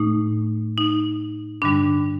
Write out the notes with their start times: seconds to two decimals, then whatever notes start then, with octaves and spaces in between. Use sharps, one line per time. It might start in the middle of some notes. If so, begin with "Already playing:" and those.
Already playing: A2 A3 D#4
0.78 D#4
1.62 G2 D3 G3 D4